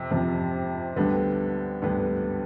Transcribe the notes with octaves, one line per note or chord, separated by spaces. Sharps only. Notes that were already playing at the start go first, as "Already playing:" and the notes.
Already playing: F2 C3
F2 C3 F3
D2 D3 G3 B3
D2 D3 G3 B3